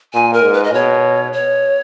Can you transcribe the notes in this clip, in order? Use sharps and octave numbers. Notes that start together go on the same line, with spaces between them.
A#2 G#5
A#4
G#2
B4
D#5
B2 C#5
C#5